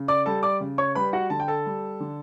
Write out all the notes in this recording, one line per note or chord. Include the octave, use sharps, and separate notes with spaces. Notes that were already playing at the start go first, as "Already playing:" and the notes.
Already playing: C#3
D5 D6
G3 A4 A5
D5 D6
C#3
C#5 C#6
G3 B4 B5
F#4 F#5
D3 A5
G5
A4 A5
G3
D3